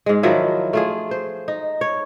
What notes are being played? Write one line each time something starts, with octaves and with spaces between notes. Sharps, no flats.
G#2 G#3
D#3 F3 F#3 E4
A3 F4 G#4
C5
D#4
C#5